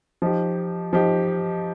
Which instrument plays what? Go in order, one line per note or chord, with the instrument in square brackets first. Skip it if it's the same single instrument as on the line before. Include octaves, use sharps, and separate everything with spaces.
[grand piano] F3 D#4 G4
F3 D#4 G4